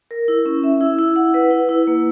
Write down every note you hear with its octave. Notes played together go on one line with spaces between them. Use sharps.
A#4
E4
C#4
E5
E4
E4
F#5
B4
E4
E4
A#3